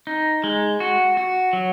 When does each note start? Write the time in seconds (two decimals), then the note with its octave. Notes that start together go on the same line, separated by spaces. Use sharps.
0.07 D#4
0.44 G#3
0.80 F#4
1.17 F#4
1.53 F#3